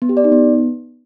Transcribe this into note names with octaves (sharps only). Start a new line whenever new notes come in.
B3
G4
D5
D#4
B3